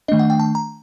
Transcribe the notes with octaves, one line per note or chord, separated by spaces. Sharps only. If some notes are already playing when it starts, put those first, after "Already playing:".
D#3 A3 D4 D#5
F#5
G5
A5
A#5